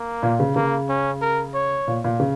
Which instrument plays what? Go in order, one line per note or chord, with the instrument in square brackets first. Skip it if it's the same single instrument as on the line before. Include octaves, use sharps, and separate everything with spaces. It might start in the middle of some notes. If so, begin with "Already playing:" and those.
Already playing: [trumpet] A#3
[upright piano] A#2
C#3
[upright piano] C#3 [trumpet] A#3
[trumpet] C#4
A#4
C#5
[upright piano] A#2
A#2
C#3